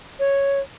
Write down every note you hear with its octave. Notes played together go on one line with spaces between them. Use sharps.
C#5